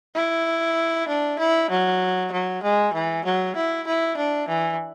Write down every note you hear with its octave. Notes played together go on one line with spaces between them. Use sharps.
E4
D4
E4
F#3
F#3
G#3
E3
F#3
E4
E4
D4
E3